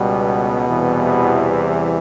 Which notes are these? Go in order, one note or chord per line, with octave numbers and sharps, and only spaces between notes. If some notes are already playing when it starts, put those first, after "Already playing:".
Already playing: C#2 B2 G3 B3
E2 C3 E3 G3